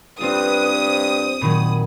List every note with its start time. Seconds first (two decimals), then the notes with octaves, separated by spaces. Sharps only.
0.21 G2 C4 F4 B4 D#6
0.86 C5
1.41 A#2 D#3 F#3 B5